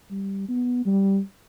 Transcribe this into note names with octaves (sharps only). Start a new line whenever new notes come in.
G3
B3
G3